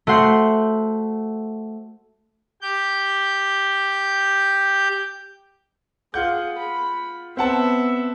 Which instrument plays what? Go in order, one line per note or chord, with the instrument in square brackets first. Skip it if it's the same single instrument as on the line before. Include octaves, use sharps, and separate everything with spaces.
[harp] A3 F#4 C5 F#5 C6 G6
[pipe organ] G4 G6
[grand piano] F4 F#5 G6 [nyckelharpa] G#4
[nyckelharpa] B5
[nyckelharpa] B3 E5 [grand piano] C4 F#5 A5